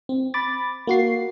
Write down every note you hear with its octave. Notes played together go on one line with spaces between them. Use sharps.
C4
B5 D6 A6
A#3 F#4 C7